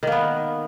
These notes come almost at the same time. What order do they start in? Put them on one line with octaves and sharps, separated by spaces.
D#3 A#3 B3